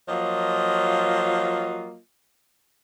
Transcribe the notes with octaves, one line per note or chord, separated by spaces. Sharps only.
F3 F#3 A#3 F4 C#5 D#5